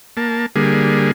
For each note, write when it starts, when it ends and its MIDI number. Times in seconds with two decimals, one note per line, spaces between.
0.17 0.46 58
0.17 0.46 81
0.56 1.11 50
0.56 1.11 55
0.56 1.11 58
0.56 1.11 68